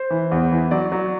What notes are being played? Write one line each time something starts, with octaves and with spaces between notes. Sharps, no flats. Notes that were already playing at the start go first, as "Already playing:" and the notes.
Already playing: C5
E3
E2
E3
F#3 D5
F#3